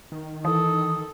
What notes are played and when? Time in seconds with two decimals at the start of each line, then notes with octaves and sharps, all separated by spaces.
0.12 D#3
0.45 E3 A4 D#6